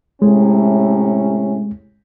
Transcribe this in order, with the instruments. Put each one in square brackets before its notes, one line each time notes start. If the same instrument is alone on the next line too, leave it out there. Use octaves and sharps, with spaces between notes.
[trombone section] A2 C3 C#4 [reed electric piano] G#3